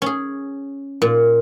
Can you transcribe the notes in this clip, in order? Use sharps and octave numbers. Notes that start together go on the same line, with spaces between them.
C#4 G#4
A#2